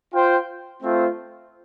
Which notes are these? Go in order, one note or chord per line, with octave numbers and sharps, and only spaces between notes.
F4 C5 G5
A3 C4 F4 C5